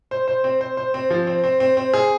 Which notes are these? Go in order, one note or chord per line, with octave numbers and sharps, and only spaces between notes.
C5
C5
C4
C5
C5
C4
F3
C4
C4
C4
C4
G#4